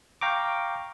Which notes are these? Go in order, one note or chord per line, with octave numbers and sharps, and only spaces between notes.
F5 G5 A#5 C#6 D6